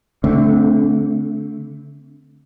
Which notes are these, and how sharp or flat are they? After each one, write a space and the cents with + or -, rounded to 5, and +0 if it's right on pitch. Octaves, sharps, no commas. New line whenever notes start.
D3 -30 A3 +0 C4 +0